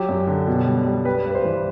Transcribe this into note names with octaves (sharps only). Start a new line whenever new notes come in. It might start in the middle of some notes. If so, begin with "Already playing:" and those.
Already playing: F#3 G4
F#2
D3
B2
G3
G3
G3 B4
G2
B4
C5
E3